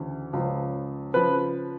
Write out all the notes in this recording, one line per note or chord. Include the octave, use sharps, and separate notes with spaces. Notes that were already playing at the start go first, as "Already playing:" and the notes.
Already playing: D2 C#3 E3
C#2 C#3 F3
C#3 F3 B4